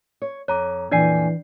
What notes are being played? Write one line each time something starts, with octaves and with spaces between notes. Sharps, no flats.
C#5
F2 C#5 A#5 D6
F2 A#2 E3 D4 D5 G#5 C7